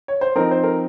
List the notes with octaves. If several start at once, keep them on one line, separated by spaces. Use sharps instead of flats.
C#5
C5
F3 C4 D#4 A#4
C5
A#4